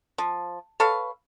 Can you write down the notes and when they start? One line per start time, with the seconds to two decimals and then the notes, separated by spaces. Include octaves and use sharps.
0.18 F3
0.80 A4 B4 C#5 F5